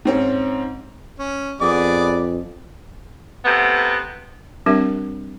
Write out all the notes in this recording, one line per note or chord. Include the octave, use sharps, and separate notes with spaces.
G#2 C4 C#4
C#4
F2 B3 G#4 D5 D6
C3 A3 B3
G3 C4 D4 G4 A#4 E5